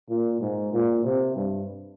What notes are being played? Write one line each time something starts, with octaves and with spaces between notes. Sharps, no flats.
A#2
G#2
A#2
C3
G2